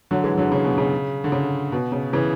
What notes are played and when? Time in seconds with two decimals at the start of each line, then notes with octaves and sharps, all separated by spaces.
0.11 D3 F#3
0.24 E3 G#3
0.38 D3 F#3
0.52 C#3
0.64 B2
0.78 C#3
1.24 D3
1.32 C#3
1.72 B2
1.92 C#3
2.13 C#3 E3